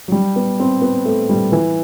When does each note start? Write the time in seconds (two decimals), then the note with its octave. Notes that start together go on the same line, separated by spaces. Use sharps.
0.08 F#3
0.12 G3
0.36 B3
0.60 C4
0.82 B3
1.05 A3
1.29 G3
1.52 E3